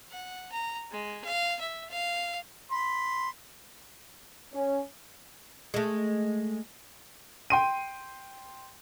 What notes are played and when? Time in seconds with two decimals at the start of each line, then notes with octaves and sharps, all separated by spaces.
0.10 F#5
0.52 A#5
0.92 G#3
1.24 F5
1.60 E5
1.90 F5
2.71 B5 C6
4.53 C#4
5.74 G#3 A3
7.50 G5 C6 D#7